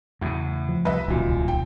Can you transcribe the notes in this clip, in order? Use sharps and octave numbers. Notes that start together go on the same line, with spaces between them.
E2 A2 C#3
F3
C2 G3 B4 D#5 E5
D1 B1 F#2 A#2 D#3
G5